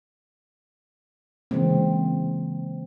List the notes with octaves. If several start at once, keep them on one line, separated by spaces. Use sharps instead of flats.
C#3 E3 G#3 A#3 C4